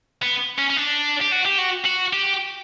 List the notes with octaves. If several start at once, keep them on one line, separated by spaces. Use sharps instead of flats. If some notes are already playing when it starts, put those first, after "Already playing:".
B3
C#4
C#4
D4
G4
F#4
G4
F#4
F#4
G4